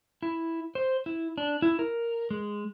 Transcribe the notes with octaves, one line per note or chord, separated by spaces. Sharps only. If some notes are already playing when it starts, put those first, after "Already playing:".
E4
C5
E4
D4
E4
A#4
G#3